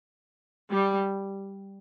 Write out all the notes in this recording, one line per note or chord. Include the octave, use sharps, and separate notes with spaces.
G3